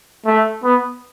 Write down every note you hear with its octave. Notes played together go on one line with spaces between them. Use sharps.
A3
B3